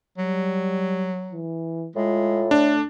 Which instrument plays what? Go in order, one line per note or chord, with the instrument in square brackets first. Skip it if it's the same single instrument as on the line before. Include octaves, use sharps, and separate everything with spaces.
[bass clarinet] F#3 [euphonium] G3
[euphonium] E3
[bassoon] A2 [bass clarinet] G#3 [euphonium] F4
[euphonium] A3 [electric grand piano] D4